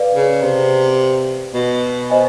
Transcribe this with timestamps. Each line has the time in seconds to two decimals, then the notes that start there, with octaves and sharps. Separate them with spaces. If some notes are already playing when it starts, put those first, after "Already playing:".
Already playing: B4 D5 F5
0.15 C#3
0.42 C3
1.54 B2
2.10 C5 D#5 G#5